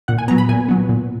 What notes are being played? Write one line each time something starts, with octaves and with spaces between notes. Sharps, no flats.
A#2 F#5
G#5
F#3 B3 A#5
B5
A#2 G#5
F#3 B3
A#2